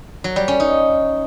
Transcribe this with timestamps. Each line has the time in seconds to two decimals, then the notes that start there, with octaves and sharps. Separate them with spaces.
0.24 F#3
0.36 G3
0.48 C#4
0.60 D#4